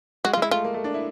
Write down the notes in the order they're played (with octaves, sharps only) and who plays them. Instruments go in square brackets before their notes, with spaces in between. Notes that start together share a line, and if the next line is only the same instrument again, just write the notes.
[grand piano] G#3 [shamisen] F#4
[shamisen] F4
[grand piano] G#3
[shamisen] E4
[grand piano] A3 [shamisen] F4
[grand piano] A#3
A3
D4
E4